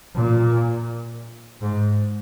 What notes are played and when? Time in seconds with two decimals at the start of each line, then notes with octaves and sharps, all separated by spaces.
0.15 A#2
1.62 G#2